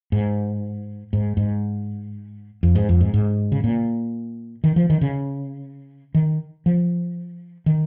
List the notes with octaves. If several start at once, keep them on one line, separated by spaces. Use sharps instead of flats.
G#2
G#2
G#2
F2
G#2
F2
G#2
G#2
C#3
A#2
D#3
F3
D#3
C#3
D#3
F3
D#3